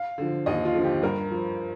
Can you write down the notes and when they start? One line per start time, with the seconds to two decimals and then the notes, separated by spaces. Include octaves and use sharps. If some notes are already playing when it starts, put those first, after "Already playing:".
Already playing: F5
0.18 D3 F3
0.46 D#2 D#5
0.65 F4
0.75 D3 F3
0.84 G4
1.03 G2 A#4
1.31 F3